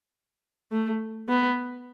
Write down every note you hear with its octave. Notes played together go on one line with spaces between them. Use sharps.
A3
B3